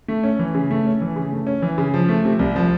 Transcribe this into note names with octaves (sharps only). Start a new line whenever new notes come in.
A3
C#4
E3
C#3
A3
C#4
E3
C#3
A3
C#4
E3
C#3
F3
A3
C3
C2
F3